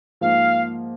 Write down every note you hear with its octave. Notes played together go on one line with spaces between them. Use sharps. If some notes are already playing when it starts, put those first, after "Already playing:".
G#2 F3 A#3 F5